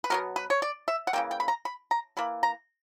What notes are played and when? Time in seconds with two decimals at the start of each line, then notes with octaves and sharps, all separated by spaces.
0.04 B4
0.10 B2 F#3 B3 A#4
0.36 B4
0.50 C#5
0.62 D5
0.88 E5
1.07 F#5
1.13 C#3 E3 A#3 G5
1.31 G5
1.40 B5
1.48 A#5
1.65 B5
1.91 A#5
2.17 E3 A#3 B5
2.43 A#5